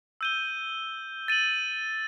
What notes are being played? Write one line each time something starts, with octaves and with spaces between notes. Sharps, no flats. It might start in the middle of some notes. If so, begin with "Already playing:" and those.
E6 G6 D#7 G7
A6 D#7 F#7